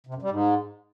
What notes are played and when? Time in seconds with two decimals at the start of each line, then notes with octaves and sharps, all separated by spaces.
0.07 C3
0.14 F#2
0.22 G3
0.30 G#2